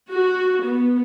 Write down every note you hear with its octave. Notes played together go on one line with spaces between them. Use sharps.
F#4
B3